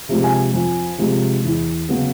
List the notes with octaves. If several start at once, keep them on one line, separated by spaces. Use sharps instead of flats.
C3 F3 G#3
G#5
F2
C3 F3 G#3
E2
C#3 F#3 B3